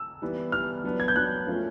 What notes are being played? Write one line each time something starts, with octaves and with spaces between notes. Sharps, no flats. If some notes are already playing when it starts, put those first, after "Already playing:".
Already playing: E6
E3 G3 B3
E3 G3 B3 F6
F#3 B3 D4
G#6
G6
F#3 B3 D4 F#6
F3 A3 C#4 F4 A#4